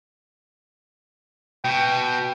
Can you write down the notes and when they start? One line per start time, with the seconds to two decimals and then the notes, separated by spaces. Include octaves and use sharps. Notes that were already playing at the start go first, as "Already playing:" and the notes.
1.65 B2 G5